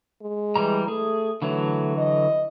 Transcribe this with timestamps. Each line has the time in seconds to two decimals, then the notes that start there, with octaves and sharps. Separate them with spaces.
0.22 G#3
0.56 E3 G3 A#5
0.88 A3 G#4
1.42 D3 E3 F#3 A3
1.98 D#5